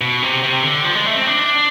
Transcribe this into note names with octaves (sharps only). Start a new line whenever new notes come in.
B2
C3
C3
D3
F3
G#3
A3
C4
D4